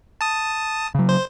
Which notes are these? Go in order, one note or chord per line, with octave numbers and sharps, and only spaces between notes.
A5 D#6
C#3 F#3
C5